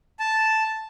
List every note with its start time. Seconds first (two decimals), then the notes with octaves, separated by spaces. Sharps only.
0.19 A5